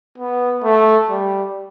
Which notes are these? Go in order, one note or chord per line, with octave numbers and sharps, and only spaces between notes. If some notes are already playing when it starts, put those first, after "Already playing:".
B3
A3
G3